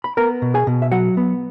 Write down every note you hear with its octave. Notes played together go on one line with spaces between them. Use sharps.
B5
B3 A#4 A#5
B2
G#4 G#5
B2
E5
F#3 F#4 F#5
B3